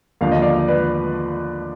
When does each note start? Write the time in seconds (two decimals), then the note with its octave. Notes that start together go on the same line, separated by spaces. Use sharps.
0.21 D#2 D3 F3 F5
0.31 D#5
0.42 D5 F5
0.68 B4 D5